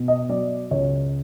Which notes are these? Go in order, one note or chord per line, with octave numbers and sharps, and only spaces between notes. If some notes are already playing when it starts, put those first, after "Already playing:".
Already playing: B2
D#5
F#3 D5
C#2 C#5